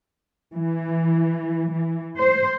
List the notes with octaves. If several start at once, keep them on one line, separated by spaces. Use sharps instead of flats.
E3
E3
C5